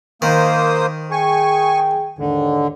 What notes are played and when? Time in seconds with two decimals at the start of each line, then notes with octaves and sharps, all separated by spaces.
0.22 D#3 A#3 C5 D#6
1.11 G#4 G5 G#5 C#6
2.19 D#2 G#2 D3 D#3